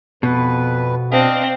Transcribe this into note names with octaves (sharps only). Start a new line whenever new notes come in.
F2 B2 B4
C4 D4 D#5 F5